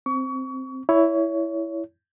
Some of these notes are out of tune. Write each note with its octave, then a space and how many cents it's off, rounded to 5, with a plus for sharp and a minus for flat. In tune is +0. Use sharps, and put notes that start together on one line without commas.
C4 +0 C#6 +30
E4 +0 C#5 +25